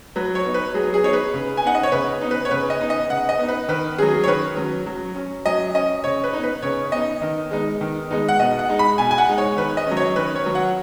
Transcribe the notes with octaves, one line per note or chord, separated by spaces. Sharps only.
F#3 B4
C#5
B3 D#4
B4
F#3 G#4
G#4
B3 D#4 C#5
B4
C#3
G#5
B3 D#4 F#5
D#5
C#5
C#3 B4
B3 D#4
B4
C#5
C#3 B4
D#5
B3 D#4
D#5
C#3 F#5
D#5
B3 D#4
B4
D#3 B4
F#3 C#4 G#4
C#5
D#3 B4
F#3 C#4
F#3
C#4
F#3 D#5
C#4 D#5
C#3 C#5
B4
B3 D#4
B4
C#3 C#5
B3 D#4 D#5
D#3
G#3 B3 D#4
D#3
G#3 B3 D#4
F#5
B2 D#5
F#5
G#3 D#4
B5
B2 G#5
G#5
F#5
G#3 D#4
C#5
D#3 B4
D#5
F#3 C#4
C#5
D#3 B4
C#5
F#3 C#4
F#5